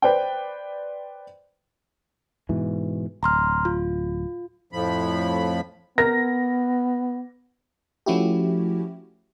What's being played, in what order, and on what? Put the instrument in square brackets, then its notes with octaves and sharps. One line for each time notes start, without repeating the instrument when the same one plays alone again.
[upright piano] B4 C5 D5 G5
[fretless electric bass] G#2 B2 E3
[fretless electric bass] D1 [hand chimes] A#5 C6 F6
[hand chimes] F4
[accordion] F2 A2 F3 B5
[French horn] B3 [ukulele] A#4 [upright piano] A#6
[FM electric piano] F3 A3 C#4 E4 F#4 G4